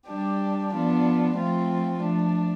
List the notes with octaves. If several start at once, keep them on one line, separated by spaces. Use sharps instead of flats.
G3 D4 G4
F3 B3 D4 F4
F3 A3 C4 F4
F3 A3 D4